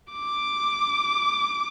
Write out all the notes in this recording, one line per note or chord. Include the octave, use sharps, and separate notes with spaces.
D6